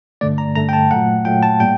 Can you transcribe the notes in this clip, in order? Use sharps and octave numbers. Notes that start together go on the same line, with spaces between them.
G2 D3 A3 D5
A#5
G2 D3 A3 A#5
G5
A5
A#2 F#3 A3 F#5
A#2 F#3 A3 G5
A5
A2 G3 A#3 G5